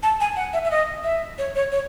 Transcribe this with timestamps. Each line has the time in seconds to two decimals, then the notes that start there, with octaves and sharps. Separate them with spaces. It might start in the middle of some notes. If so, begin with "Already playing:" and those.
0.03 A5
0.20 G#5
0.36 F#5
0.53 E5
0.65 E5
0.71 D#5
1.04 E5
1.38 C#5
1.55 C#5
1.72 C#5